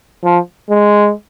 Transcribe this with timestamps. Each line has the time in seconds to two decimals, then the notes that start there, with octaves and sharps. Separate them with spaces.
0.24 F3
0.70 G#3